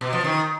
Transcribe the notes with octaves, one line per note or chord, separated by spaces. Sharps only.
B2
F3
D#3